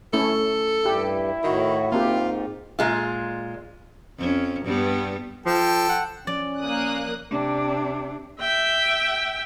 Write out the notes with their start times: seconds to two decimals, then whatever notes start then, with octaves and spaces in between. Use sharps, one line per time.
0.13 A3 C#4 E4 A4
0.86 G2 E4 G4
1.44 A2 D#3 F#4
1.92 G#2 A#3 C4 F4 G4
2.79 A#2 G#3 F4
4.19 F2 C#4
4.66 G2 G3 B3
5.46 F3 A4 G5
5.89 F#5
6.27 F3 C#4 D5
6.59 A#3 D#6 F#6
7.31 C3 D4
8.40 E5 G5